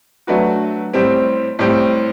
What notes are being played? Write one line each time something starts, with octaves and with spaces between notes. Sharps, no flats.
F#3 A3 D4 F#4 B4
A2 G3 C4 G4
A2 G3 C4 G4